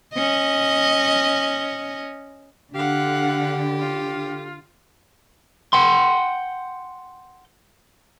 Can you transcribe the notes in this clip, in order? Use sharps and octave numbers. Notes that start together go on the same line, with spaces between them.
C#4 D#5
D3 G4 F5 F#5
F4
F#5 G5 C6